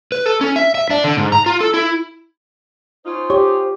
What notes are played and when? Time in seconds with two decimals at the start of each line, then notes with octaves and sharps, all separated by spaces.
0.12 B4
0.25 A4
0.41 C#4
0.56 E5
0.75 E5
0.90 D4
1.04 D3
1.17 G#2
1.32 A#5
1.46 F4
1.61 A4
1.74 E4
3.05 C#4 D#4 F4 C5
3.30 G4 C#5